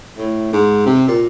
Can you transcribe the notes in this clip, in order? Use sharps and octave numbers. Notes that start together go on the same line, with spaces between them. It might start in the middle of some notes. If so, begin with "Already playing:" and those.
A2
G#2
C3
A#2